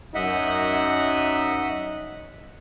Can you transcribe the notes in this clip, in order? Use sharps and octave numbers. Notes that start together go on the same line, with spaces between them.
F#2 D#4 D#5 E5 F#5